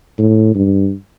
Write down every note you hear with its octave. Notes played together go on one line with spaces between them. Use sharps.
A2
G2